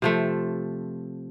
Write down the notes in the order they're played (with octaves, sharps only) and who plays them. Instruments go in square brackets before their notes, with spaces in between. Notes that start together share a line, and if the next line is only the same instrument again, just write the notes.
[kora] C3 F3 A3